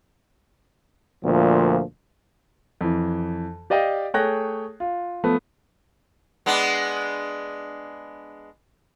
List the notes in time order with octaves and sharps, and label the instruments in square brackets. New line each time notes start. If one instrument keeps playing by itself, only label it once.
[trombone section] D2 A#2 F3
[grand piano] F2 E3
G4 D5 D#5 F5 G5
A3 G#4 C#5 G5 F#6 A#6
F4
F3 A3 B3
[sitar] G#3 B3 D4